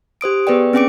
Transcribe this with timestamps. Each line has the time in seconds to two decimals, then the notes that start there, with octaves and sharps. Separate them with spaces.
0.21 G4 C5 D#6 D7
0.47 B3 G#4 B4 D5 G5
0.73 C4 C#4 G#4 G5 D6 D7